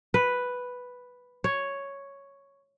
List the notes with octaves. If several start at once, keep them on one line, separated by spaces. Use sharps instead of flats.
B4
C#5